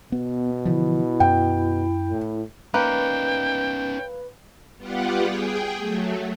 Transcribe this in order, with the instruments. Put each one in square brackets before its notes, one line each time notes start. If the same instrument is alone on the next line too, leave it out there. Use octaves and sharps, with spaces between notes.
[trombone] B2 [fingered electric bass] B3
[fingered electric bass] D3 E3 F3 [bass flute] E4
[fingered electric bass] F#2 [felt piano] G5
[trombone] A2
[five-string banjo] A#3 [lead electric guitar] C#4 D#4 [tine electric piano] B4 [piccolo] G5
[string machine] G3 B3 F4 G4 F#5
G#4 G5
F#3 A3